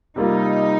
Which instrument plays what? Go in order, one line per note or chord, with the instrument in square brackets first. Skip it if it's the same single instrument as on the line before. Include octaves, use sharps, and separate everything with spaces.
[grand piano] C3 G3 A#3 F4 [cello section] D#4